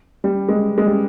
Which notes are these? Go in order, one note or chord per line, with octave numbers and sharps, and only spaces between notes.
G3
G#3
G#3
G3